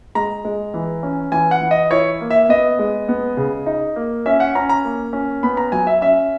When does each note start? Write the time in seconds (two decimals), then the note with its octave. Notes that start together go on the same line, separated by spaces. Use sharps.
0.15 G#3 A#5
0.45 G#3
0.74 E3
1.03 C#4
1.32 E3 G#5
1.51 F#5
1.61 E3
1.71 D#5
1.91 E4 C#5
2.21 A#3
2.30 E5
2.49 B3 D#5
2.79 G#3
3.09 B3
3.37 C#3
3.66 D#4
3.96 A#3
4.26 C#4 E5
4.40 F#5
4.55 C#4 A#5
4.69 A#5
4.84 A#3
5.13 C#4
5.43 B3 B5
5.57 A#5
5.72 F#3 G#5
5.87 E5
6.01 C#4 E5